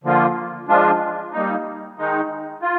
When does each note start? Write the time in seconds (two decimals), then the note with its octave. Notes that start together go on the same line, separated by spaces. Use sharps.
0.04 D3 F3 A#3 F4
0.69 F3 G#3 D4 F4
1.33 G3 A#3 D#4
1.98 D#3 G#3 D#4
2.62 F4